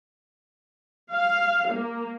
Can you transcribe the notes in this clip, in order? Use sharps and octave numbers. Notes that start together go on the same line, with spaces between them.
F5
A#3